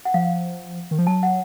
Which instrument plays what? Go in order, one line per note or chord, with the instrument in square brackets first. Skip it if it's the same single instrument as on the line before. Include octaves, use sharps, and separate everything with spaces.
[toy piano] F#5
[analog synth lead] F3 [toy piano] F5
[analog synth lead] D#3
F3
[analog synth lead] F#3 [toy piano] A5
[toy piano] F#5